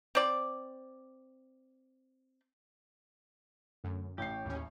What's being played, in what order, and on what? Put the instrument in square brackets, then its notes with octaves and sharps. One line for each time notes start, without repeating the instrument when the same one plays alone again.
[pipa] C4 D5
[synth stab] F#2 [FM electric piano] D3 A3
[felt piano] A1 C7 [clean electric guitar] G4 [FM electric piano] C#5 G5 C#6
[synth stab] D#2 A2 C#4